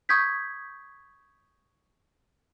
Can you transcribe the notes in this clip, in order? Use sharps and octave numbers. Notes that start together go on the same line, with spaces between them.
C#6 D#6 G6 G#6 B6